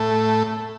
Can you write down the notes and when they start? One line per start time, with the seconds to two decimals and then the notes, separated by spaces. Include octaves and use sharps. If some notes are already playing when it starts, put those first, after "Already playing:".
Already playing: A2 A3